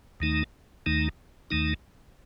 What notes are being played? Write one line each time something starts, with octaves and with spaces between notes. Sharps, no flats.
D#2 D#3 A3 D#4
D#2 D#3 A3 D#4
D#2 D#3 A3 D#4